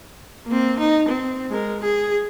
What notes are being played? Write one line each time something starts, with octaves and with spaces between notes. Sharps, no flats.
A#3 C4
D#4
C4
G#3 A#4
G#4